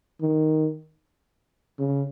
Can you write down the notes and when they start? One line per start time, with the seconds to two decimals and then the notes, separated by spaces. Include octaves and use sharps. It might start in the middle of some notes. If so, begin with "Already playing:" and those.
0.21 D#3
1.79 C#3